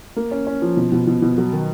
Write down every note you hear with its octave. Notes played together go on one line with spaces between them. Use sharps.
A#3
C#4
C#4
F3
B2
B2
B2
B2
F#3
D#3